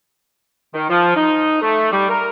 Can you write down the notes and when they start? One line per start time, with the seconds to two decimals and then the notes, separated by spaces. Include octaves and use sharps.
0.74 D#3
0.89 F3
1.15 D#4
1.62 A3
1.91 G3
2.09 A#4